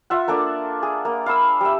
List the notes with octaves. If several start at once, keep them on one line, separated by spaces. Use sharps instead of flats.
F4 E5 F#5
A#3 D4 A4 D5
G#4
A#3
F5 B5 E6
G3 E5